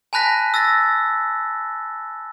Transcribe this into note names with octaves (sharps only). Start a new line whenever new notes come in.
G#5 A5 B5 F#6 A#6 B6
E6 A6 A#6